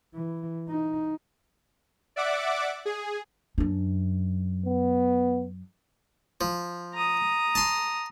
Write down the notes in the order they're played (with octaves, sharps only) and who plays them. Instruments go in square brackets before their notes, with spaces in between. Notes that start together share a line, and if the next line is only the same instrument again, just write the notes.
[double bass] E3
D#4
[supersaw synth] D5 E5 F#5 D6
G#4
[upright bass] F#2 D4
[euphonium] B3
[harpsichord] F3
[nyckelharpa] A#5 D#6
[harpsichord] A5 C6